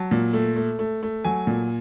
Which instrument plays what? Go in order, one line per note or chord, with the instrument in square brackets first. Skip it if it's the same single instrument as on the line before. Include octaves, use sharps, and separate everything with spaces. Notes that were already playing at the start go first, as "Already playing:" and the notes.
Already playing: [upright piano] F#3 A5
A#2
A3
A3
A3
A3
F#3 G#5
A#2